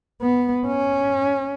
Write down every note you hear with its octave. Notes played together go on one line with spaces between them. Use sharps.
B3
C#4